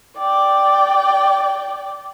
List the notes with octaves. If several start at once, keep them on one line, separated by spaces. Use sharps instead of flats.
D5 G5